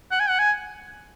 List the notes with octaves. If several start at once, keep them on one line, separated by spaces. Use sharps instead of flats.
F#5
G#5
F#5
G#5